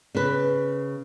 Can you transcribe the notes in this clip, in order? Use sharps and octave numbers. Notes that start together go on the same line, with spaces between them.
C#3 B4